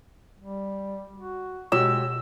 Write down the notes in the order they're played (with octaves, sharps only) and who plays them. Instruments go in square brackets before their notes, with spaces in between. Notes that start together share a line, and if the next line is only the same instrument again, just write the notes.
[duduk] G3
F#4
[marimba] B2 [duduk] G#3 [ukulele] F#4 G4 C#5 [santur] E6